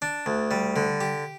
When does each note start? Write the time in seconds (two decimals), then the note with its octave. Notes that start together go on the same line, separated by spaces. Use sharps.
0.02 D4
0.26 D2
0.51 G3
0.76 D3
1.01 G4